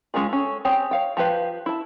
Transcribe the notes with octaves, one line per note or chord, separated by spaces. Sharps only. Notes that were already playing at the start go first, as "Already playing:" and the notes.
G#3 C#4 F4 G#4
C#4 A4
C4 G4 G#4 C#5 G#5
C#5 F5 G5
F3 G4 B4 F5
E4 A5